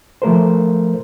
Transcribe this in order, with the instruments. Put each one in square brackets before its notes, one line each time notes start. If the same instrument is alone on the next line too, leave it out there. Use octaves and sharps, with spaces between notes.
[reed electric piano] F3 A3 A#4 C5